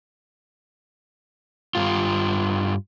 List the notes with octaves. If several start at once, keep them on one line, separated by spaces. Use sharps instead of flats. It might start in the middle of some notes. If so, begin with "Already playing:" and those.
G2 F4